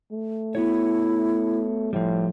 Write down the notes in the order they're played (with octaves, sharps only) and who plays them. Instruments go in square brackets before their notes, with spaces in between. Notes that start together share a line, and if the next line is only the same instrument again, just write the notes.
[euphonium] A3
[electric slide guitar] B3 F#4 C#5 [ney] E4
[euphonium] A2 [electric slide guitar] F3 G3